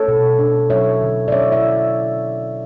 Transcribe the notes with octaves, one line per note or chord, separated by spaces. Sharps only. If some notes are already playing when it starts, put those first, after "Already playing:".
Already playing: A4 C#5
B2
D4
F#3 C#5 E5
D3
D5
C#4 C#5 E5
E5